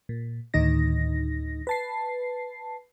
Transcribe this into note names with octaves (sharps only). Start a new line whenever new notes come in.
A#2
D2 A2 D#3 D#4 A#6
B4 A5 C7